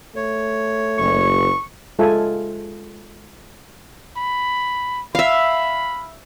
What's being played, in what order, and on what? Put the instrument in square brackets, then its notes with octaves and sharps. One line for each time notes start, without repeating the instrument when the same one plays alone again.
[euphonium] A3 [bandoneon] C#5
[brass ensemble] F#1 [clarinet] C#6
[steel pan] G#3 F4 A4 E5 G#5
[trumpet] B5
[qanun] E5 F5 [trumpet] B5